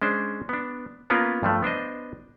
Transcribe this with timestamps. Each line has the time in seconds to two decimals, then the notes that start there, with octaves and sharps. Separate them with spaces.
0.02 G#3 C#4 D4 C5
0.49 B3 D4
1.10 A#3 B3 C#4 F4 A#4 B4
1.43 G2 F3 A3
1.63 B3 D4 C5 D#5